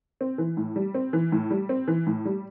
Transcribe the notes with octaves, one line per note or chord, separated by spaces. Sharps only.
C4
E3
A2
G3
C4
E3
A2
G3
C4
E3
A2
G3